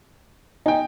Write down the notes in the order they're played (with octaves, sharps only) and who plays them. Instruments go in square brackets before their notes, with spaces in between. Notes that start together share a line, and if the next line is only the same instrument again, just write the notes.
[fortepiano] D#4 [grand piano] G5 G#5